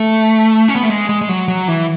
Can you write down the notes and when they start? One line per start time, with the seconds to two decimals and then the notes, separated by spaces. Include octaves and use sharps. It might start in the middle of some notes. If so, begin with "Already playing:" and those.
Already playing: A3
0.68 C#4
0.75 B3
0.83 A3
0.90 G#3
1.09 G#3
1.21 G#3
1.29 F#3
1.48 F#3
1.68 E3